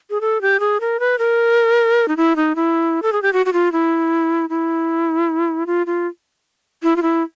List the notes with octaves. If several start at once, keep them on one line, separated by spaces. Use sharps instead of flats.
G#4
A4
G4
G#4
A#4
B4
A#4
D#4
E4
D#4
E4
A4
G#4
G4
F#4
F#4
F4
E4
E4
F4
F4
E4
F4
E4